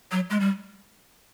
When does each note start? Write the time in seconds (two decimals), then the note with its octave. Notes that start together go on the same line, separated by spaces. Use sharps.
0.12 F#3
0.30 G#3
0.40 G3